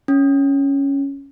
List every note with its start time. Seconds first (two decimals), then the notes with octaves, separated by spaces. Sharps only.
0.08 C#4